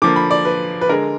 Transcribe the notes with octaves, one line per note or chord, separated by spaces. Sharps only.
D3 F3 A#3 D6
B5
D5
B4
B4
D3 G#3 A#4